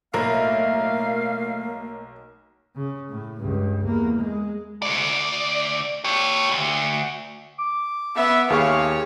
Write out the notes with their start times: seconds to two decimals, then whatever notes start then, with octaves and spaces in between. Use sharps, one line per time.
0.14 B1 A2 A3 A#3 E4 A#4 F5
2.76 C#3
3.10 A2
3.39 C#2 G2
3.85 E2 A#3
4.18 G#3
4.82 D2 D5
6.04 G4 C#5
6.51 D2
7.59 D6
8.16 B3 E5
8.50 D#2 G#4 C#5 F5 C#6